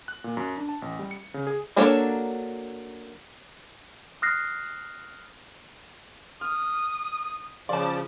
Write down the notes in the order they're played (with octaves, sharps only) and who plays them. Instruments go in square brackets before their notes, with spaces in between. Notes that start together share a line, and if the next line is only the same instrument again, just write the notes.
[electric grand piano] F#6
A#2
F#2
D4
A5
A1
G3
C#7
C#3
G#4
[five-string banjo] F#3 A#3 D4 A4 C#5
[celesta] D#6 F6 F#6 A#6 C7
[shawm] D#6 [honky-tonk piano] F6
[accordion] C#3 F3 [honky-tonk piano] D5 A5